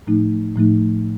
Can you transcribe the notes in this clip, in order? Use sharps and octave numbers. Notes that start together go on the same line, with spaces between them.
A2 F3 A3 D#4
A2 F3 A3 D#4